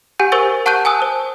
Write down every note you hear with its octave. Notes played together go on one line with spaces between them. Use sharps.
G4 F#5 G#5 G6
A#4 C5 G#5 C#6 E6 A6
F#5 A5 C#6 F#6 G6 D#7
G#5 A5 D#6 E6
C5